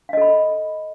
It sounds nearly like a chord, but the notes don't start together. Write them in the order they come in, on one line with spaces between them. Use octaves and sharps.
F5 D#5 A4 B5